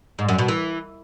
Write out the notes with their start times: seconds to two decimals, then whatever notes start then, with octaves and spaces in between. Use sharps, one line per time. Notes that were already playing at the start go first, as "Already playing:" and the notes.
0.19 G#2
0.29 F#2
0.38 B2
0.48 E3